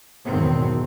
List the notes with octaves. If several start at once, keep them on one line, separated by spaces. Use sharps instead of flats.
G#1 E2 B2 D#3 F#3 C4